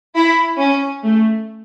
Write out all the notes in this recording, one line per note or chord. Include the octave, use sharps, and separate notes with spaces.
E4
C#4
A3